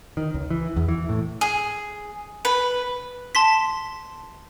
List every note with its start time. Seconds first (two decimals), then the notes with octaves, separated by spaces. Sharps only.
0.17 D#3
0.34 C#2
0.50 E3
0.77 E2
0.88 E3
1.09 A2
1.41 G#4
2.45 B4
3.35 A5 C6 B6